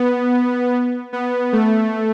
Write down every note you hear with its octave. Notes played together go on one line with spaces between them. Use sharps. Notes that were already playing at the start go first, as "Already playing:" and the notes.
Already playing: B3
B3
A3